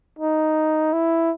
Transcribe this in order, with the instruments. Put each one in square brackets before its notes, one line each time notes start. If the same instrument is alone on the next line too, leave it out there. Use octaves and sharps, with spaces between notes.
[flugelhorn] D#4
E4